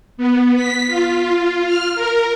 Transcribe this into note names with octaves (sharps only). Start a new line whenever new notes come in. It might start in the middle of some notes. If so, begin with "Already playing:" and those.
B3
B6
F4
F4
F6
A#4